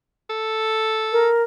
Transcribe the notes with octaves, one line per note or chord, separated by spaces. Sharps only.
A4
A#4